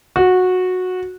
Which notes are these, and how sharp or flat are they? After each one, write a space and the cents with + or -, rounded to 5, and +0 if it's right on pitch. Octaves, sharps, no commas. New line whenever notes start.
F#4 -15